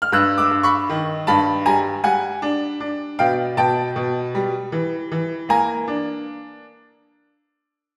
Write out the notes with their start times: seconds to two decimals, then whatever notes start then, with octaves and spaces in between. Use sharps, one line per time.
0.02 F6
0.12 G2 E6 F#6
0.38 D6 E6
0.51 G2
0.63 B5 C#6
0.89 D#3
1.27 G2 A5 B5
1.66 G3 G#5 A#5
2.04 G3 F#5 G#5
2.42 D4
2.80 D4
3.19 B2 F5 G5
3.57 B2 G5 A5
3.96 B2
4.35 G3
4.72 E3
5.12 E3
5.49 A#3 G#5 A#5
5.88 D4